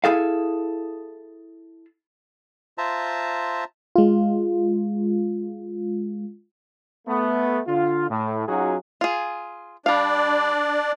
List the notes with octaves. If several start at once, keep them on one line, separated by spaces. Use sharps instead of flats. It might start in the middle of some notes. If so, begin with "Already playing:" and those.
E4 G#4 A4 F5
F4 C5 E5 A5 A#5
G#3 F4
A3 B3
D3 F4
A2
F#3 C#4 D#4 F4 F#4 G#4
F4 G#4
G3 D4 D5 F5